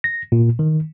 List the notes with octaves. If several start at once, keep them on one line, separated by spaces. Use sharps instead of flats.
A#6
A#2
D#3